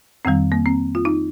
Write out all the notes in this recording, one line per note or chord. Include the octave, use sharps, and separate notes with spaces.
F2 D#3 G3 C4
A#3
C4
F4
D#4